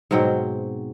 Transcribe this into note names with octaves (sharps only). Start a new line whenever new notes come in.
G#2 B2 F#3 C4